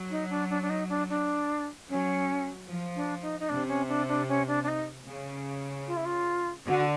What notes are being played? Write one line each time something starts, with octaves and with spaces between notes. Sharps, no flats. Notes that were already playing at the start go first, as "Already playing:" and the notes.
Already playing: F#3
D#4
D4
D4
D4
D#4
D4
D4
F#3 C#4
F3
D4
D#4
D#4
C3 D4
C#4
D4
D4
C#4
D4
D4
D#4
C#3
F4
E4
F4
D3 F#4